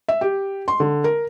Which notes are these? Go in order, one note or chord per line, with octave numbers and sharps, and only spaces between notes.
E5
G4
C6
D3
A#4